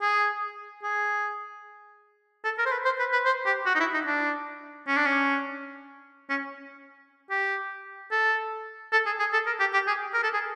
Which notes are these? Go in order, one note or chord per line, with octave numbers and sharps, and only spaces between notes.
G#4
G#4
A4
A#4
C5
B4
C5
B4
B4
C5
G4
F#4
D#4
E4
D#4
D4
C#4
D4
C#4
C#4
G4
A4
A4
G#4
G#4
A4
A#4
G4
G4
G#4
A#4
A4
G#4